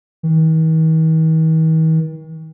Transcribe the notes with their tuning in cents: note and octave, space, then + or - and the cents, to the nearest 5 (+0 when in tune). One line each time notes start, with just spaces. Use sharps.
D#3 +45